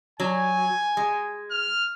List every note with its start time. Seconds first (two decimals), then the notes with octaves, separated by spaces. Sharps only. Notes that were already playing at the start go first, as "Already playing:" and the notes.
0.20 F#3 G#5
0.97 G#3
1.51 F6